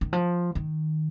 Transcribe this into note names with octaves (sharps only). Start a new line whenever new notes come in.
D#3
F3
D#3